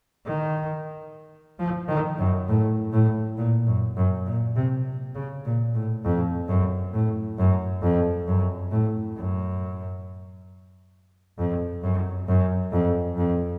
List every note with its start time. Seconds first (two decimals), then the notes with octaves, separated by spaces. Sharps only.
0.25 D#3
1.59 F3
1.88 D#3
2.18 F#2
2.48 A2
2.92 A2
3.37 A#2
3.67 F#2
3.97 F#2
4.26 A#2
4.56 C3
5.15 C#3
5.45 A#2
5.74 A2
6.05 F2
6.48 F#2
6.93 A2
7.38 F#2
7.82 F2
8.27 F#2
8.71 A2
9.16 F#2
11.38 F2
11.83 F#2
12.28 F#2
12.72 F2
13.17 F2